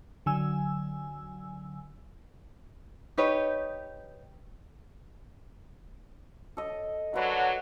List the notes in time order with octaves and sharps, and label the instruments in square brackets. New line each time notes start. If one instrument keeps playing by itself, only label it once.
[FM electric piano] D3 F#3 G#5 E6
[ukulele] D#4 G4 B4 C#5
[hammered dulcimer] A4 D#5
[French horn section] D3 F#3 [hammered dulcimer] B4 F#5